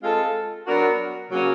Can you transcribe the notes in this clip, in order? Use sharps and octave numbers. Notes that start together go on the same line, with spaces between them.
G#3 C4 F4 A4
F#3 B3 D4 F#4 A#4
C#3 F#3 A#3 C#4